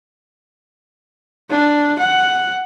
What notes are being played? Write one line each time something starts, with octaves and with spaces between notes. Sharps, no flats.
D4
F#5